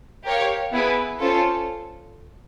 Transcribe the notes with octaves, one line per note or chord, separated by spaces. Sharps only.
G4 A#4 C#5 F5
B3 E4 G#4 B4
C#4 F4 A4 C5